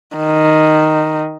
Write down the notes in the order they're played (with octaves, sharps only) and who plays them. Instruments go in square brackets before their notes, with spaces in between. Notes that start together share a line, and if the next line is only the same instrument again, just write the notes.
[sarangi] D#3